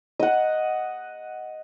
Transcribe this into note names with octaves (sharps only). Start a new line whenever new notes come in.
D#5 F#5